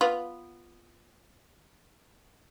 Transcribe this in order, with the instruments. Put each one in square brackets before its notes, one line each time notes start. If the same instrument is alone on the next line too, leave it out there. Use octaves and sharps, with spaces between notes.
[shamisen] B3 F4